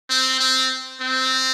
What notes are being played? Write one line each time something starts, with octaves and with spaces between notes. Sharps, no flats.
C4
C4
C4